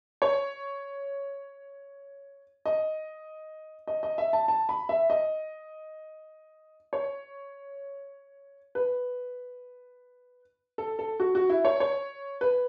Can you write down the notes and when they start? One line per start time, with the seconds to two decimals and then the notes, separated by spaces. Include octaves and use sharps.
0.22 C#5
2.66 D#5
3.87 D#5
4.03 D#5
4.18 E5
4.33 A5
4.48 A5
4.69 B5
4.89 E5
5.10 D#5
6.93 C#5
8.75 B4
10.78 A4
10.99 A4
11.20 F#4
11.35 F#4
11.50 E4
11.65 C#5
11.80 C#5
12.41 B4